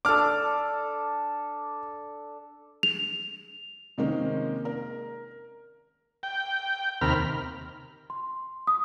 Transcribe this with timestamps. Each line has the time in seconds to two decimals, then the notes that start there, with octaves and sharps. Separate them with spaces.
0.05 D4 A4 D6 F6
2.83 F7
3.98 C3 D#3 G#3 A#3 C#4
4.65 A#4
6.23 G5
7.01 D#2 C3 A#4 B5 F6
8.10 C6
8.67 D#6